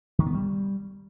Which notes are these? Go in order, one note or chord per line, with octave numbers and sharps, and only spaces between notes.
D#3
B3
G3